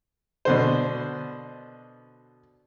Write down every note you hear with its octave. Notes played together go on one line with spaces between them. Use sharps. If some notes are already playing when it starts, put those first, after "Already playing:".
B2 D3 C5